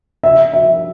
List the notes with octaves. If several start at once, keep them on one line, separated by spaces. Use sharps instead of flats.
E5
E5